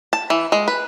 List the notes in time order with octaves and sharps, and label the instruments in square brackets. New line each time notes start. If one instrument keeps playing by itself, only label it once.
[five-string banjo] A5
E3
G#3
B4